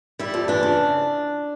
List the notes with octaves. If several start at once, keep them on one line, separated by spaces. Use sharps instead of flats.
G3 E4
F2
E3 D4
C#3